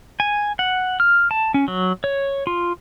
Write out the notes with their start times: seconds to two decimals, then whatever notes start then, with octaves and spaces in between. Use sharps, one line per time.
0.20 G#5
0.59 F#5
1.00 F6
1.31 A5
1.54 C#4
1.68 F#3
2.04 C#5
2.47 F4